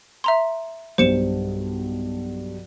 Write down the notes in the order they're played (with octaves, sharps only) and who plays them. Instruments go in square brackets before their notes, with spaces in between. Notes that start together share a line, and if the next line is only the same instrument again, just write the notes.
[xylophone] E5 A#5 C6
[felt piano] B1 G2 [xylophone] C5 C#7 E7